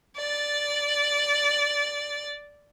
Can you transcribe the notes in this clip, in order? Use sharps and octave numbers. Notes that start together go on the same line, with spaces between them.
D5 A6